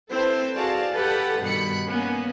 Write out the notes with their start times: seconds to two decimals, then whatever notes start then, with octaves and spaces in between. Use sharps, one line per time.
0.10 C4 E4 A4 B4 C5
0.55 F#4 G#4 D5 F5 A5
0.93 G4 A4 B4 F#5
1.42 G2 B2 D#3 B5 C#7
1.86 A#3 B3 C#4